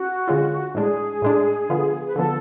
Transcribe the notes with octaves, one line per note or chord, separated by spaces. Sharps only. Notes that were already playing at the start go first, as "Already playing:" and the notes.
Already playing: C#4 F#4
D3 G#3 C#4 F4
A2 G#3 D4 G#4
A2 G#3 D4
D3 F3 B3
B4
D3 F3 B3 A4